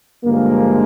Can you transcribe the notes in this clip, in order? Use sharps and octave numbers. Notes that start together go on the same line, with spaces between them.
G2 D3 F3 G#3 A#3